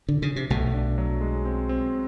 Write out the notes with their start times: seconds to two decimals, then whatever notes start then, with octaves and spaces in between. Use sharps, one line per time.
0.09 D3
0.22 C#3
0.36 C3
0.50 B1 B2 A3
0.74 D4
0.98 F#3
1.21 G#3
1.45 C4
1.69 C4